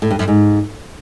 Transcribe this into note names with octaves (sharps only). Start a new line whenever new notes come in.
A2
G2
F#2
G#2